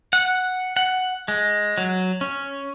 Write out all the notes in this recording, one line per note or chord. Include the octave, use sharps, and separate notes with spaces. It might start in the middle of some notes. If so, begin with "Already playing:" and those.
F#5
F#5
G#3
F#3
C#4